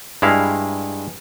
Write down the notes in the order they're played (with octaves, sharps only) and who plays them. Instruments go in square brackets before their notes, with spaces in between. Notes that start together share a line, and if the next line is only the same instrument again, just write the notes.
[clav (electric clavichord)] G2 G#3 E4 F5